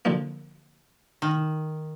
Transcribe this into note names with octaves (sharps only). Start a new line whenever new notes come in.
D3 F3 A#3
D#3